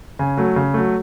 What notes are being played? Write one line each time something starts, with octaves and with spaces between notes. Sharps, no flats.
C#3 G#5
F#3 A3
C#3
F#3 A3